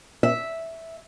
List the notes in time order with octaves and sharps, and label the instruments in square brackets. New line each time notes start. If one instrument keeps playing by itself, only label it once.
[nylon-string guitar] E5